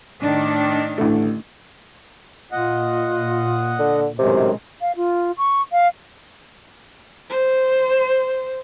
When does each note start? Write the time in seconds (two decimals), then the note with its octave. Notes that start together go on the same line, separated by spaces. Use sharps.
0.22 A2 D#3 D4
0.98 A1 D3 A3
2.52 A#2 F4 D#5 F#5
3.79 D3
4.19 F#2 A2 C3 D#3 G#3
4.81 F5
4.96 F4
5.37 C#6
5.72 F5
7.29 C5